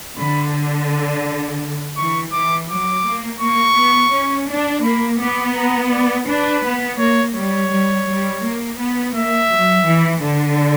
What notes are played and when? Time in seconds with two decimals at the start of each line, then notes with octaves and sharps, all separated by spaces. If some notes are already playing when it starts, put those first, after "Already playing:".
0.18 D3 B5
1.97 E3 C#6
2.32 E3 D6
2.69 F#3 D6
3.04 A#3
3.40 A#3 C#6
3.77 B3
4.12 C#4
4.49 D4
4.83 A#3 B5
5.20 B3 D6
5.55 A#5
5.92 D5
6.27 D4 B4
6.63 B3
6.99 A#3 C#5
7.35 G3 C#5
7.70 G3
8.07 G3
8.42 A#3
8.79 B3
9.14 A#3 E5
9.50 F#3
9.85 E3
10.22 D3